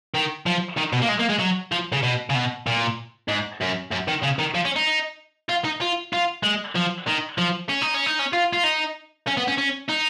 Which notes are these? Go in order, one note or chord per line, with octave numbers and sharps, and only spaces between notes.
D#3
F3
D#3
B2
A#3
G#3
A#3
G#3
F#3
F3
C#3
B2
C#3
B2
A#2
G#2
F#2
F#2
D#3
C#3
D#3
F3
C#4
D#4
F4
D#4
F4
F4
G#3
F3
D#3
F3
C#4
D#4
C#4
D#4
C#4
F4
F4
D#4
C#4
B3
C#4
C#4
D#4